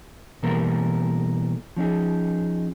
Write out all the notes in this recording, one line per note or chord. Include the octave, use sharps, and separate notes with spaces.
B2 E3 G3 A#3 A4 A#4
F3 C#4 D#4 G#4